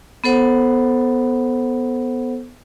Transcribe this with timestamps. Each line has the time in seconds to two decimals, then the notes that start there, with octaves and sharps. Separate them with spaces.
0.24 B3 A4 C5 F#5